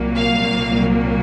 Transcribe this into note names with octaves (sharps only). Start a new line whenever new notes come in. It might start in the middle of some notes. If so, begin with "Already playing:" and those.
Already playing: C2 A#2 F#3 A#3
F5